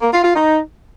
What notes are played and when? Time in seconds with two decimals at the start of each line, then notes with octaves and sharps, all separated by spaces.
0.01 A#3
0.12 F4
0.24 F4
0.35 D#4